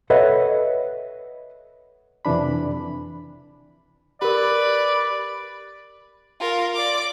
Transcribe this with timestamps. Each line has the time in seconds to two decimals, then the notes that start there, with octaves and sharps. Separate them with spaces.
0.10 A4 B4 C#5 D#5 E5 F#5
2.25 F2 C3 E3 D4 B5
4.22 G4 A#4 B4 D5
6.40 F4 A#4
6.75 D5 D6